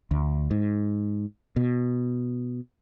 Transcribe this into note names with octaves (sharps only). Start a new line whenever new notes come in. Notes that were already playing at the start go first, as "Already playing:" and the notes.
D2
G#2
B2